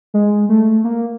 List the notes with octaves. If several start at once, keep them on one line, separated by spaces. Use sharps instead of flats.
G#3
A3
A#3